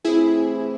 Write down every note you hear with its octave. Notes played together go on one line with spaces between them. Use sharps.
C3 E3 A3 C4 E4 G#4